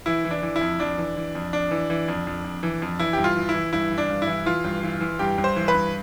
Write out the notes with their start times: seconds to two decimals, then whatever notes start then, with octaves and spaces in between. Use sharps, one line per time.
0.06 E3 E4
0.25 E3
0.31 D4
0.43 E3
0.56 E4
0.61 F2
0.80 F2 D4
0.98 E3
1.17 E3
1.35 F2
1.53 F2 D4
1.71 E3
1.90 E3
2.08 F2
2.27 F2
2.44 F2
2.63 E3
2.82 F2
2.99 E3 E4
3.13 G2 G4
3.24 F4
3.37 E3
3.49 E4
3.54 E3
3.73 G2 E4
3.91 E3
3.98 D4
4.10 G2
4.22 E4
4.27 E3
4.46 E3 F4
4.64 G2
4.83 E3
5.01 E3
5.19 G2 G4
5.38 G2
5.44 C5
5.56 E3
5.68 B4
5.74 G2